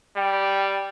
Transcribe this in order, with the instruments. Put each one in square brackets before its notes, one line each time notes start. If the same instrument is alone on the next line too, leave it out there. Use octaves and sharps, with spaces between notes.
[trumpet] G3 [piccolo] G5